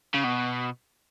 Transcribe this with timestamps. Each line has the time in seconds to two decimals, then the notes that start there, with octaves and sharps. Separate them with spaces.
0.14 C#3
0.24 B2